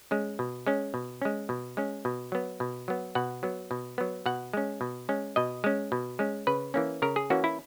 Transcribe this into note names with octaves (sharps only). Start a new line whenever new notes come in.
G#3 C#4
B2
G#3 C#4
B2
G#3 C#4
B2
G#3 C#4
B2
F#3 B3
B2
F#3 B3
B2 F#5
F#3 B3
B2
F#3 B3
B2 F#5
G#3 C#4
B2
G#3 C#4
B2 D#5
G#3 C#4
B2
G#3 C#4
C#3 B4
E3 A#3 C#4
C#3 A#4
G#4
E3 A#3 C#4 F#4
E4